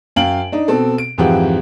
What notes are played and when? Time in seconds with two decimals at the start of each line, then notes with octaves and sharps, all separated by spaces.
0.16 F#2 F5 G5 D7 F#7
0.52 D4 D#4
0.68 B2 C4 A4
0.98 D7
1.18 F2 G#2 E3 F3 G4 F#5